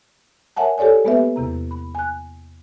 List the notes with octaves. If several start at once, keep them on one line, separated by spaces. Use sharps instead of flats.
A#4 C#5 E5 F#5 G#5 A5
G4 A4 C#5 D5 G#5
G#3 A#3 B3 G4 B4 E5
E2 C3 A#5
B5
G#5 F#6